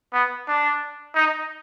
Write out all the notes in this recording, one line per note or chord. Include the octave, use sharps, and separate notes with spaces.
B3
D4
D#4